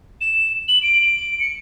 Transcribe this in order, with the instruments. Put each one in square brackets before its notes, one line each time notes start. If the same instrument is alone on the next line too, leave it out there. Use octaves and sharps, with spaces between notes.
[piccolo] E7
F#7
D7
C#7